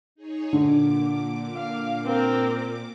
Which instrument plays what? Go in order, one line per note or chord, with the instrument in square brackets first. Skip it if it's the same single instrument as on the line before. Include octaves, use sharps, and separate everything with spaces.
[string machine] D#4 G#4 C#5
[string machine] A#2 D6 [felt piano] D3
[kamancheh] F5
C4 A#4